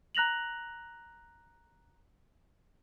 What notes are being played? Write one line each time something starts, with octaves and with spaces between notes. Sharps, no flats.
A#5 F#6 A#6 F7 F#7